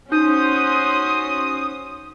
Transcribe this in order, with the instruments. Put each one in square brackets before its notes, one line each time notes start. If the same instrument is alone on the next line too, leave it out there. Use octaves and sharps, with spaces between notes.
[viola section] C#4 F#4 C5 [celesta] D#4 G6 [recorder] D#6